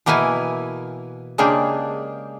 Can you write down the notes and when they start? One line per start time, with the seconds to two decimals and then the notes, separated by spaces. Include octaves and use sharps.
0.06 B2 E3 A#3 E4 B4 G#5
1.38 C#3 G#3 A#3 D4 G4 G#4